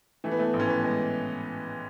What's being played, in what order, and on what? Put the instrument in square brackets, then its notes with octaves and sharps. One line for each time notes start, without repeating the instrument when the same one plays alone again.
[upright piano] E3 A3
B3
A3
A1
C#4
B3
G#3